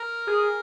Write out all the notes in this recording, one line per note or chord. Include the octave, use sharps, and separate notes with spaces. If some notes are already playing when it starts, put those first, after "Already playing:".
Already playing: A#4
G#4